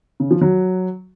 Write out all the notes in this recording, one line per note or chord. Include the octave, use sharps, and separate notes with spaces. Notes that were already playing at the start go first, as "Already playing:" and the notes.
C#3
F3
F#3